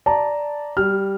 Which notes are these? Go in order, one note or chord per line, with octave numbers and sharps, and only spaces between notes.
D5 A5 A#5
G3 F6